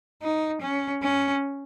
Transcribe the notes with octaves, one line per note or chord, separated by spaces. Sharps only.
D#4
C#4
C#4